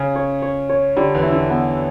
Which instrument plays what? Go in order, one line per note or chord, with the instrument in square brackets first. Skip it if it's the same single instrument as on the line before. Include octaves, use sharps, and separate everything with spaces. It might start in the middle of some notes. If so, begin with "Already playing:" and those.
Already playing: [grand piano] C#3 [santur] C#4
[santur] C#5
C#5
C#5
[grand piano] D3 [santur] G3
[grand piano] E2 E3
[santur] E4
[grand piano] D3
[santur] B3